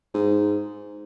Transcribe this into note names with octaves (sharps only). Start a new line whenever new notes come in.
G#2